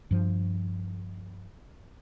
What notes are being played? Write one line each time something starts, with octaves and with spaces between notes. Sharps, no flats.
G2 F3